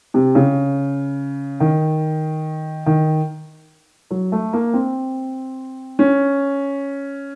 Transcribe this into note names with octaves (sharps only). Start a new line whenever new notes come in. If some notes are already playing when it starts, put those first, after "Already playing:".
C3
C#3
D#3
D#3
F#3
A3
A#3
C4
C#4